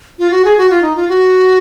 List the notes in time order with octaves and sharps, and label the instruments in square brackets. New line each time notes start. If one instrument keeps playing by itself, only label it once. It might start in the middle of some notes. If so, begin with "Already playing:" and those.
[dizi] F4
F#4
G#4
F#4
F4
D#4
F4
F#4